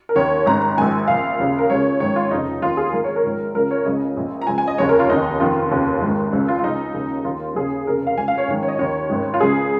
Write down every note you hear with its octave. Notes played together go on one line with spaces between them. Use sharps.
A#4
D#2 D#3 C#5
G#1 G#2 D#3 A#5
A#5
A#1 G#2 D#3 G#5
A#1 A#2 F5
D#2 C#3
A#4
C#2 C#3 C#5
A#1 G#2 D#3 C#5
F4
F1 F2 C#3 D#4
D#2 D#3 F4
G#4
G#1 G#2 D#3 A#4
C#5
A#4
A#1 G#2 D#3
C#2 C#3 A#4
C#5
C#2 C#3 D#5
A#1 A#2
A#5
C#2 C#3 G#5
G#5
D#5
F1 D#2 C#3 C#5
A#4
F4
F1 D#2 D#3 D#4
F1 F2 D#3 F4
F1 D#2 C#3
G#1 G#2 D#3
C#2 C#3
F4
F4
C#2 C#3 D#4
D#2 C#3
D#2 D#3 F4
D#2 C#3 G#4
F1 D#2 C#3 A#4
F5
C#2 C#3 G#5
F5
C#5
A#1 G#2 D#3
C#5
D#5
D#2 D#3 C#5
G#1 G#2 D#3
F4
C#2 C#3 G#4